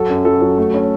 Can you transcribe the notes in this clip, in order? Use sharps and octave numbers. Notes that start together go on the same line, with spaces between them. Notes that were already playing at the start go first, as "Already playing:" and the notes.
Already playing: F#3 A4
F#2
F#3 A4
F#3
A3
C#4